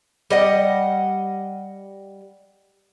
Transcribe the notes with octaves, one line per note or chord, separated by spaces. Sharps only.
G3 D#5 F#5